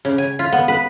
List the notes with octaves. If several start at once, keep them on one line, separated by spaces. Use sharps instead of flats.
C#3
G#5
F4
B3
B4